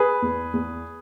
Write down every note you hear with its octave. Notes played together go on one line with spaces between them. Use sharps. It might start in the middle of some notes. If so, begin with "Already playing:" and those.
Already playing: G#4 B4
E2
E2